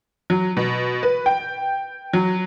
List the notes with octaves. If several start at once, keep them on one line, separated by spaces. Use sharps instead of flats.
F#3
B2
B4
G5
F#3